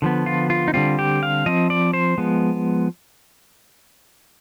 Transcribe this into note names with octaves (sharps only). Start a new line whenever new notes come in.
D3 F3 B3
F4
F4
D#4
D3 G3 C4 F4
G4
F5
F3 C4 D#5
D5
C5
F3 G#3 B3